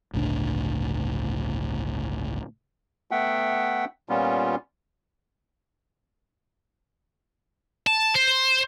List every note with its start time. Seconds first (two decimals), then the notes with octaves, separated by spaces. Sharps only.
0.14 G1 C#2 A2 D4
3.11 A3 B3 E5 F#5 G5
4.09 A#2 G3 B3 C#4 F4
7.87 A5
8.15 C5